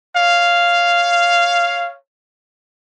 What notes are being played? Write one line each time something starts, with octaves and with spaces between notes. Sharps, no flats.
C#5 F5